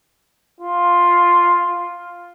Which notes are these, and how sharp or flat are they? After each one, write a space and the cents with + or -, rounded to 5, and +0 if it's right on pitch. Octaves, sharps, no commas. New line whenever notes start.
F4 +5